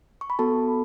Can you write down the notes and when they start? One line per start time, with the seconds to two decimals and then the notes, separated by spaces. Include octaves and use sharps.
0.21 C#6
0.30 B5
0.39 B3 F#4 A4 A5